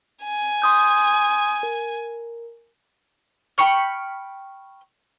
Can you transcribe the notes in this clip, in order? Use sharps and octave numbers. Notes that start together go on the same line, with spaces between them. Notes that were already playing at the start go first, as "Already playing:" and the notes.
G#5
C6 D#6 G6
A#4
G5 B5 C#6 F6